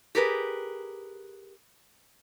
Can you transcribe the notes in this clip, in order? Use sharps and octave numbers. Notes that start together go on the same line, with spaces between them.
G4 G#4 A#4 B4